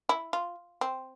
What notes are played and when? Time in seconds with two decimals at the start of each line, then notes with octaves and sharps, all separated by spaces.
0.09 E4
0.33 F4
0.81 C4